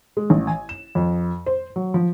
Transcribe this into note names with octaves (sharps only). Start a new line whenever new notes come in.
G#3
A1
G#5
E7
F2
C5
F#3
F3